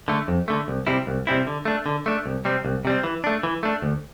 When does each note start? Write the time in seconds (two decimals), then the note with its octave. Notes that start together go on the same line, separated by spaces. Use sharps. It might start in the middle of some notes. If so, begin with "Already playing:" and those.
0.08 D3 A3
0.28 F2
0.48 D3 A3
0.68 C2
0.87 C3 G3 C4 E4
1.07 C2
1.27 C3 G3 C4 E4
1.47 D3
1.65 A3 D4
1.86 D3
2.06 A3 D4
2.26 C2
2.45 C3 G3 C4
2.65 C2
2.85 C3 G3 C4
3.04 E3
3.24 A3 D4
3.43 E3
3.63 A3 D4
3.82 D2